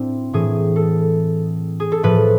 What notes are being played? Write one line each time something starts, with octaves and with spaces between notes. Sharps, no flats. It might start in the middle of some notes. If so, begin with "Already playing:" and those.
Already playing: A2 C4 D4 E4
A2 E3 G#4
A4
G#4
A4
A2 F3 B4